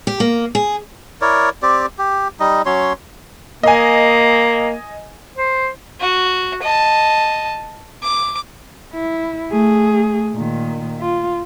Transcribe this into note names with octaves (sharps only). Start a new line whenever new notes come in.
G4
A#3
G#4
E4 A#4 C#5 D5
C4 G4 D5
G4
G3 D#4 D#5
F#3 C#4 C#5 C6
A#3 D#5 G#5
C5
F#4
D#5 A5
D6
E4
A3 G#4
A#2 D#3
F4